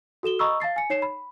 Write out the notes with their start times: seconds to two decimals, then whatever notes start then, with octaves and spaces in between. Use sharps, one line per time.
0.23 F#4 A4 E7 G7
0.39 D#5 A#5 B5 C#6 D#6 E6
0.60 F5 A5 A6 C7
0.76 G#5 C#7
0.90 D#4 C#5 C7 E7
1.02 B5